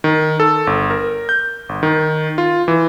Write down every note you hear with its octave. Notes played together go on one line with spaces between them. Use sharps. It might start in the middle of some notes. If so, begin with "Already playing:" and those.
D#3
A4
G1
A#4
G6
G1
D#3
F4
E3